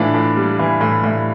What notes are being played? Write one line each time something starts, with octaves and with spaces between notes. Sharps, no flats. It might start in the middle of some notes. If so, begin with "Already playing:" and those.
Already playing: A2 E3 D4 F4
A2
G3
E3
A2
A2